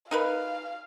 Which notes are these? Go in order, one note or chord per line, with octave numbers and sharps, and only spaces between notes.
D#4 A#4 B4 F5